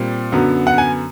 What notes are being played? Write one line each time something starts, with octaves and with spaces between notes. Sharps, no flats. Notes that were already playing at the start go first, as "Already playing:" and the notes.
Already playing: A#2 G3 C4
F#2 D3 F#3 B3
F#5
G#5